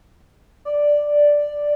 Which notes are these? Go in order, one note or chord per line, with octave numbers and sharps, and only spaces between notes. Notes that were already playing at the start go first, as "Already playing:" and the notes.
D5